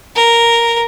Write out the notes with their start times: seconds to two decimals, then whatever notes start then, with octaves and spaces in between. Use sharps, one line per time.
0.16 A#4